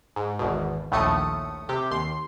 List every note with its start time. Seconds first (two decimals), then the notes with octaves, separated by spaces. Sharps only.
0.16 G#2
0.39 G#1 E2 B2
0.91 A#1 D#2 A2 A3 D#6 C#7
1.69 C3 G4
1.91 D#2 C6